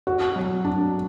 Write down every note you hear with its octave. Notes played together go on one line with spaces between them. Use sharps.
F#4
F#3
D4